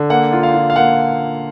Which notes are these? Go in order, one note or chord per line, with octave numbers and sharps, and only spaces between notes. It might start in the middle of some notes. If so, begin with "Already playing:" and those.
Already playing: D3
A#3 F#5
F4
F5
F4
F5
A#3 F#5